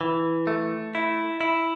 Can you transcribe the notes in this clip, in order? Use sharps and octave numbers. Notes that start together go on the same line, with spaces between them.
E3
A3
E4
E4